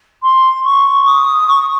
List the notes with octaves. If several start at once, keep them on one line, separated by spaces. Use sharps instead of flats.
C6
C#6
D#6
C#6